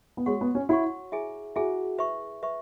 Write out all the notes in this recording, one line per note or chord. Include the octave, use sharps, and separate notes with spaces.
B3
G#3 F#4 C#5 F#5 C#6
B3
C#4
E4 F#4 C#5 F#5 C#6
E4 G#4 E5 G#5
E4 F#4 G#4 E5 G#5
B4 E5 C#6
B4 E5 C#6